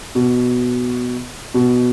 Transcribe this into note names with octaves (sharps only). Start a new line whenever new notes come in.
B2
B2